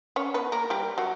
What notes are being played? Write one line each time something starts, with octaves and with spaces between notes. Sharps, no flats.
C#4 C#5
B3 B4
A#3 A#4
G3 G4
F#3 F#4